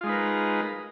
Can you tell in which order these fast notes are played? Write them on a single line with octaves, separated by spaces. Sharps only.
F4 G#3 D#4 B4 A#4